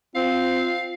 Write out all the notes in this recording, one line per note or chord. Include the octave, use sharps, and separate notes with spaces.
C4 F4 F5